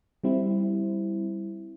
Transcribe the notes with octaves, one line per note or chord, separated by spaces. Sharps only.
G3 C4 E4